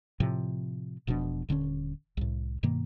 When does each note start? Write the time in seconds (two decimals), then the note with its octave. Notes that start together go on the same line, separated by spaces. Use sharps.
0.20 A2 C3 F3
1.07 E1 B2 F3 D4
1.49 D#1 D3 C4 C#4
2.17 C2 A2
2.63 G2 B2 D#3 A#3